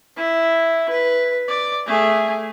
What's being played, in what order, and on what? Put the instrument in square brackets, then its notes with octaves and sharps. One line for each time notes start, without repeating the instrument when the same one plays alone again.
[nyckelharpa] E4
B4
D5
A3 G#4